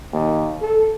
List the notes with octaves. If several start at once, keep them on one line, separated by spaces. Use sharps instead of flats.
D#2
A4